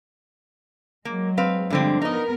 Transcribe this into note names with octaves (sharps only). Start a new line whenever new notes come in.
F#3 G#3 A#3
C4 B4 F5
G2 D3 F3 G3 G#3 C4
B3 D#4 A#4 D#5